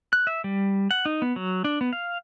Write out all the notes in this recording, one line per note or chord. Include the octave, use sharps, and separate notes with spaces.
F#6
E5
G3
F#5
D#4
B3
F#3
D4
B3
F5